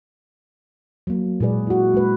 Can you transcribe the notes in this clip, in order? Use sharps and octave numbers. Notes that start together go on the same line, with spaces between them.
F#3 A#3
A#2 G#3 E4 G#4 B4 D5
E4 F#4
G#3 D4 B4